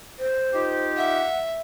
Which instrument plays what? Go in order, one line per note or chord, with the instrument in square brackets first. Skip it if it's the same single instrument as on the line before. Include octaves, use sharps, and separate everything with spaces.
[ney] C5
[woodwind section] D#4 F4 G4
[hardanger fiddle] E5 [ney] F#5